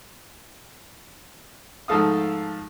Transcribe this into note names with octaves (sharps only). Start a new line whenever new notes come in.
G#2 F3 A3 A4 F5 D#6